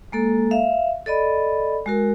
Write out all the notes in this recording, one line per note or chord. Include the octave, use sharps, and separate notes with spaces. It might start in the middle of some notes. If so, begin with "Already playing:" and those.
G#3 A#3 A4
E5 F5
A4 D5 D#5 B5
G#3 F#4 A#4